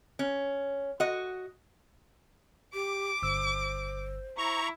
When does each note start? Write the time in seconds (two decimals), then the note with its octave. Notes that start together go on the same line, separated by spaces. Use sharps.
0.19 C#4
1.00 F#4 D#5
2.74 G4 D6
3.23 G1 C5 E6
4.38 E4 A#5 C#6